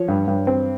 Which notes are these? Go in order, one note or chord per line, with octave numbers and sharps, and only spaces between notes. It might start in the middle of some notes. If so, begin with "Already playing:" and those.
Already playing: F3 C#5
G2
G2
C4